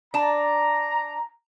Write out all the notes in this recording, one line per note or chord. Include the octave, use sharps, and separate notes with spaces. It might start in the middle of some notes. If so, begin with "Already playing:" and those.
D4 A5 A#5